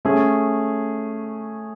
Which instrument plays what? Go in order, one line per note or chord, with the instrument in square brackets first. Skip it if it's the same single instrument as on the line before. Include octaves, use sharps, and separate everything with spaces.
[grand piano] A3 C#4 G#4